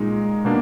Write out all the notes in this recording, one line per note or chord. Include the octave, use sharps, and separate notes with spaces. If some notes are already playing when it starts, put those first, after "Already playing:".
Already playing: A#2 G#3 D#4
B2 A#3 D4